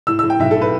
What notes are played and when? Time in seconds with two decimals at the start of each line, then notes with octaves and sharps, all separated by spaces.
0.07 A2 E6
0.19 E6
0.24 A2
0.30 G5
0.40 B1 E5
0.51 A4
0.56 A2
0.62 B4